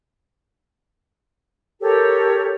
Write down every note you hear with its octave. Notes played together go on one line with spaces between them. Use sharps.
G4 A4 A#4 C#5